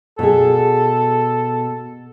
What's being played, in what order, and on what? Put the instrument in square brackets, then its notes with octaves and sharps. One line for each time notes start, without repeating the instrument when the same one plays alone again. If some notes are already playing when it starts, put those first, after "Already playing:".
[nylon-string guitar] B2 G#4 [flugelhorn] A4